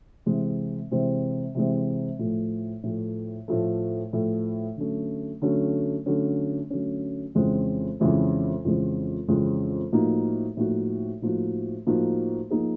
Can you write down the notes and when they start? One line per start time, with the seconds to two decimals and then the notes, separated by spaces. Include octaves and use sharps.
0.26 C3 E3 G#3 C4
0.91 C3 E3 G#3 C4
1.55 C3 E3 G#3 C4
2.19 A2 F3 A3
2.83 A2 F3 A3
3.48 A2 F3 A3
4.13 A2 F3 A3
4.77 D3 F#3 A3 C#4
5.42 D3 F#3 A3 C#4
6.06 D3 F#3 A3 C#4
6.70 D3 F#3 A3 C#4
7.35 F2 C#3 E3 G#3 C4
8.00 F2 C#3 E3 G#3 C4
8.65 F2 C#3 E3 G#3 C4
9.28 F2 C#3 E3 G#3 C4
9.92 A2 F3 A#3 D#4 F#4
10.57 A2 F3 A#3 D#4 F#4
11.22 A2 F3 A#3 D#4 F#4
11.87 A2 F3 A#3 D#4 F#4
12.51 F3 A#3 D#4 G#4